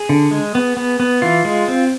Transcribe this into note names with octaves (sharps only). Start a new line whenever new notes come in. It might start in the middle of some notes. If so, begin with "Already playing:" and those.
Already playing: G#4
D3
G#3
B3
B3
B3
E3 F4
G#3
C4